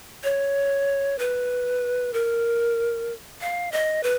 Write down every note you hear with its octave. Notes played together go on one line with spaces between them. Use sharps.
C#5
B4
A#4
F5
D#5
B4